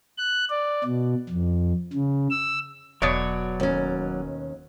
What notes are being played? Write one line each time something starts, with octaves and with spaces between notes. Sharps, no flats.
F#6
D5
B2
F2
C#3
E6
E1 B2 F#3 C#5 D5
D#2 C#4